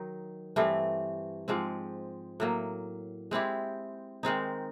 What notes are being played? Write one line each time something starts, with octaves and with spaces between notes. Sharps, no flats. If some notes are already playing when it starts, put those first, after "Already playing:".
Already playing: D#3 F#3 D#4
G2 E3 A3 C4
G#2 F3 G#3 C4
A2 F#3 A#3
G#3 C4 E4 G4
D#3 G#3 C4 D#4